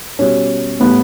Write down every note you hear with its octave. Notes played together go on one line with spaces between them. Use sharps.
B2 G3 C#4
A2 G3 B3